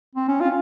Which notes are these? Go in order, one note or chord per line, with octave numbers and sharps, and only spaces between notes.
C4
C#4
F4